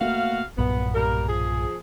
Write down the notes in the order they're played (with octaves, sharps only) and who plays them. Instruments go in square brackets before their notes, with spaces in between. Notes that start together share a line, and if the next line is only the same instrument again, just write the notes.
[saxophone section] B2 F#4 F5 [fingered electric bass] A3 A#3
[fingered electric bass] B1 G2 A#2 [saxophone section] B3
[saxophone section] G3 A#3 A#4
F3 G#4